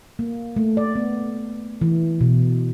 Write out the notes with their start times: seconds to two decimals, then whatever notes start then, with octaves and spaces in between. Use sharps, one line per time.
0.19 A#3
0.56 A3
0.77 D5
0.95 B3
1.81 E3
2.21 B2